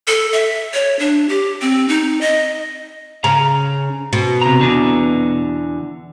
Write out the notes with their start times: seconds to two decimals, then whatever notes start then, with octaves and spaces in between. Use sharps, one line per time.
0.07 A4
0.33 E5
0.74 C#5
0.99 D4
1.29 G4
1.61 C4
1.89 D#4
2.21 D#5
3.24 C#3 A#5
4.13 B2
4.42 C3 A#5
4.61 E2 D3